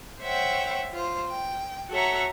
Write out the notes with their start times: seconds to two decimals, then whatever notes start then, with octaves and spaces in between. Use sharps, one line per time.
0.20 C5 C#5 E5 F#5 G5
0.93 F4 C5
1.28 G5
1.90 F#4 A4 C#5 E5 F#5 A#5